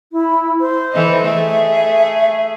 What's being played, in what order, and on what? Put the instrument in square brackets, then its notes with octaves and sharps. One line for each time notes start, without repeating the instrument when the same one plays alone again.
[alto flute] E4
C5
[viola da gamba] E3 A4 D#5
[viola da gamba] A3 G#4 [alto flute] E5